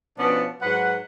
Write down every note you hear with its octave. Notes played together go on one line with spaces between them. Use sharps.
B2 F3 B3 C#4 D4
G#2 F#3 B4 F#5